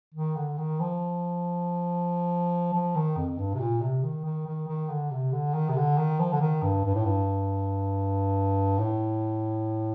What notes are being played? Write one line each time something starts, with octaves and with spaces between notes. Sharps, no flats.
D#3
D3
D#3
F3
F3
D#3
F2
G2
C3
A#2
C3
D#3
D#3
D#3
D#3
D3
C3
D3
D#3
C3
D3
D#3
F3
D3
D#3
G2
G2
A2
G2
A2